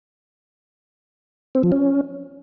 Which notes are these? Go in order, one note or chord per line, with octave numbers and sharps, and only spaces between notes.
C4
F3
C#4